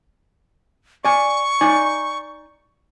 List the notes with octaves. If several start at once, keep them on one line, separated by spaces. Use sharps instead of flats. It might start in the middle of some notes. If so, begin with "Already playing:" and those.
D5 G#5 C#6
D#4 D5 G#5